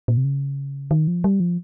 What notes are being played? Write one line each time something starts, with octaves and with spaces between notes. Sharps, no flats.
A#2
C3
C#3
D#3
F3
G3
F3